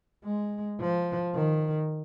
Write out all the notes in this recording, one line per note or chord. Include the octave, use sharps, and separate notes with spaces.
G#3
F3
D#3